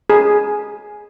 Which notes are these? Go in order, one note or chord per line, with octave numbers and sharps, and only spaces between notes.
G#4